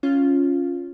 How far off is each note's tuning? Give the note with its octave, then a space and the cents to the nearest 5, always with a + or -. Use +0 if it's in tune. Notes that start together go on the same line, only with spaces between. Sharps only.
C#4 +0 F4 +0